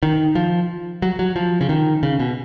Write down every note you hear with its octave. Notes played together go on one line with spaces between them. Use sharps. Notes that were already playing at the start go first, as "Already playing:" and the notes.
D#3
F3
F#3
F#3
F3
C#3
D#3
C#3
B2